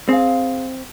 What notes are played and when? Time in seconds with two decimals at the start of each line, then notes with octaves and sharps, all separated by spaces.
0.09 C4 G#4 F5